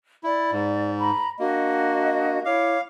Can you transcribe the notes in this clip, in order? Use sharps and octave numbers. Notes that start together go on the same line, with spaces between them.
E4 D5
G#2
A#5 B5
A#3 D4 F#4 D#5
E4 C#5 F5 D6